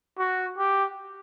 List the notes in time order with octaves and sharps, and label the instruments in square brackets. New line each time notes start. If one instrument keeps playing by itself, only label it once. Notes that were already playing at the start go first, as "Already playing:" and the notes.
[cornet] F#4
G4